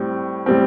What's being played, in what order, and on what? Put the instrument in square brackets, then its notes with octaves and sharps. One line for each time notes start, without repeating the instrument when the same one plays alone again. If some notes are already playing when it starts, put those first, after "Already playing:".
Already playing: [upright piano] A2 G3 C4
A2 G3 C4